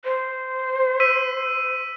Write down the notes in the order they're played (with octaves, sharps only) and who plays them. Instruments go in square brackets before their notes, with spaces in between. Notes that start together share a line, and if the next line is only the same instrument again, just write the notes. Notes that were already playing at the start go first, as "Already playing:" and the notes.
[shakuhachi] C5
[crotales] E6 B6 D#7